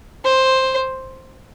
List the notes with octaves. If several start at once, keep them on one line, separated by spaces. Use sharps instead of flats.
C5